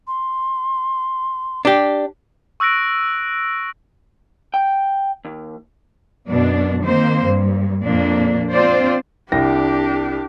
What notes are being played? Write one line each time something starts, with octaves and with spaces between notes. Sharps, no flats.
C6
D4 G4
C#6 E6 F#6 A#6 D7
G5
D#2
F#2 B2 D4
D#3 A#3 C4 C5
G2
F2 A#2 A#3 D4
C4 D4 F4 C5 D5
C2 D4 G4 G5 A#6